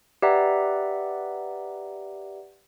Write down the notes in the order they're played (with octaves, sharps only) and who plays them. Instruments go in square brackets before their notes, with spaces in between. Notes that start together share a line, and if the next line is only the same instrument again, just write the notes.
[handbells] G4 B4 D5 E5 F#5 A#5